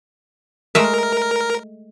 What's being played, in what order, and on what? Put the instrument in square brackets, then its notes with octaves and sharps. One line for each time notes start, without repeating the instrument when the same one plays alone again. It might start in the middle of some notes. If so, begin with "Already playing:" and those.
[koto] G#3 A3 E5 [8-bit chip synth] A#4